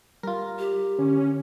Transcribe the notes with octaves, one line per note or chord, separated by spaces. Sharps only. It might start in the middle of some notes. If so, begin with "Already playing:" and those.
G3 F4 A#4
G4
D3 C#4